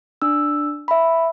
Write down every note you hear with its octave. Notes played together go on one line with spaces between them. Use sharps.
D4 E6
E5 B5